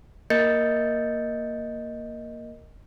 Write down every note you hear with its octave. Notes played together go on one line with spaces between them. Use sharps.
A#3 A#4 D#5 G6 A6 C#7